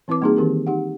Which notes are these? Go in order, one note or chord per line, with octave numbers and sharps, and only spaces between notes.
E3 C4 E4 B4 D6
G3 A#3 C4 D#4 F#4 G#4
D#3 E3 C4 G4 G#4 A#4
D#4 G4 F#5